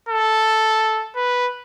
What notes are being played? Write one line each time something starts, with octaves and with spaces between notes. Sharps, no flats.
A4
B4